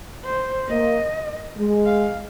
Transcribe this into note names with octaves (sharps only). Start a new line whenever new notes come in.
C5
A#3 D#5
G#3
F5